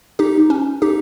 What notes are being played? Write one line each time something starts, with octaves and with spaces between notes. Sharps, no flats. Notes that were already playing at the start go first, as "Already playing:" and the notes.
D#4 G4
C#4
D#4 G4